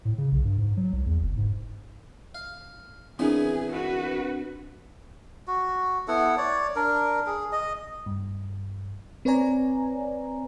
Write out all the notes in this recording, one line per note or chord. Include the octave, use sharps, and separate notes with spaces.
A2
C#3
B1
G2
G#2
F#3
C2
E2
F#1
G#2
F5
C#3 E3 B3 C4 D4 G#4 A#4
F#4 B4
F#4
B3 E4 A4 F#5
C#5 D5
D4 A#4
G#4
D#5
G2
C4 B4 C#5 D5 G#5 A#5